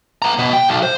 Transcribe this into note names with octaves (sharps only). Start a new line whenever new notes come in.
B3 A#5
B2 B3
G5
B1
C5